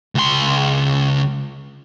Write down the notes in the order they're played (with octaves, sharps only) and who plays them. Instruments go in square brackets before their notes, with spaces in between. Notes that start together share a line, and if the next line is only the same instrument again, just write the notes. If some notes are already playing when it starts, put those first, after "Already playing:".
[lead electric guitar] C#2 C6